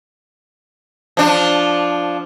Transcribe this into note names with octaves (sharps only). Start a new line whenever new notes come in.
F3 D4